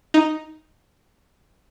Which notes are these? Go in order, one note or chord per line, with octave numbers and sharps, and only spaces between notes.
D#4